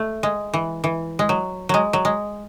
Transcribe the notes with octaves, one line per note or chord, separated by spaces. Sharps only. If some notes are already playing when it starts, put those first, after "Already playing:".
Already playing: A3
G#3
E3
E3
G#3
F#3
F#3 G#3
F#3
G#3